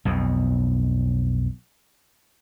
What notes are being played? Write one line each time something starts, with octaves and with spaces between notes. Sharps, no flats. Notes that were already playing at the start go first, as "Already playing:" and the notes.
B1 F2 B2